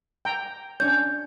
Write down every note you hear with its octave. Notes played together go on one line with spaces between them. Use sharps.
G5 A#5
C#4 D4 C#5 G6